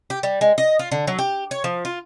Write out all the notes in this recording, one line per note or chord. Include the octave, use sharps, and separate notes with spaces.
G4
G3
G#3
D#5
F4
D3
F#3
G4
C#5
F3
F4